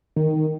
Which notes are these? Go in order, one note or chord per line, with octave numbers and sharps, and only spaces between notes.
D#3